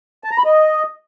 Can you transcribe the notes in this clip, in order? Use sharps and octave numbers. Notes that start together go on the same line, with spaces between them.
A5
A#5
B5
D#5